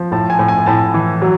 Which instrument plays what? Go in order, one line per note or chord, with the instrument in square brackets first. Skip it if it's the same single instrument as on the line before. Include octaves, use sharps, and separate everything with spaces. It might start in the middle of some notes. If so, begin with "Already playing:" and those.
Already playing: [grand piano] F3
A2 A5
G#5
A2
G#5
A2 A5
E3
F#3